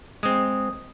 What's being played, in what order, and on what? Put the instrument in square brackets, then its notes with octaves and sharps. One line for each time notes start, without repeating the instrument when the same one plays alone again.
[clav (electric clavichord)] G#3 C4 [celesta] D#6